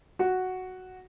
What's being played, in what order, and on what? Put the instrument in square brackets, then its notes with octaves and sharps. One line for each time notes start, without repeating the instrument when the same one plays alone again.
[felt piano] F#4